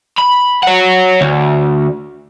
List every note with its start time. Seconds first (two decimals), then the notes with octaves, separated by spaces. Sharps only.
0.18 B5
0.63 C#5 F#5
1.21 D2